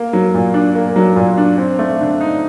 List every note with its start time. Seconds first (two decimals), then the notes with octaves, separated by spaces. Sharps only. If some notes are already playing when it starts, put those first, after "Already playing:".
Already playing: A#3
0.13 F#3
0.35 A#2
0.54 D4
0.75 A#3
0.96 F#3
1.16 A#2
1.38 D4
1.58 C4
1.79 A3
2.00 D3
2.21 D#4